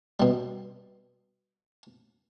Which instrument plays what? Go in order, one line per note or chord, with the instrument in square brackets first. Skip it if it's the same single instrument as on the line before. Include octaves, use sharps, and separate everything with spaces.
[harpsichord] B2 G3